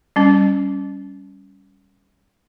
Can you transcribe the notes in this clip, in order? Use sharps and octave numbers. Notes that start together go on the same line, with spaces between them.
G3 C#4